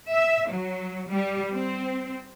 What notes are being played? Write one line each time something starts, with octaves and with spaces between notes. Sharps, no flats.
E5
F#3
G3
C4